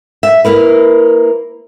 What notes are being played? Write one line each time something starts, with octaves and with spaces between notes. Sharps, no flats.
E5
A#3 E4 A#4 B4